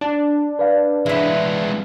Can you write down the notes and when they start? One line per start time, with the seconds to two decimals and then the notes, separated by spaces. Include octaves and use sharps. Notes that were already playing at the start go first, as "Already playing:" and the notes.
0.01 D4
0.59 B4 D5 F5
1.06 G#3 B3 E4 E5